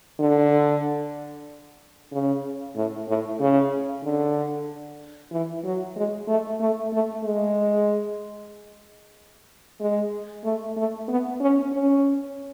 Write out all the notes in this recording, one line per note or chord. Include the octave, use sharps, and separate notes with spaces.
D3
C#3
A2
A2
C#3
D3
E3
F#3
G#3
A3
A3
A3
G#3
G#3
A3
A3
B3
C#4
C#4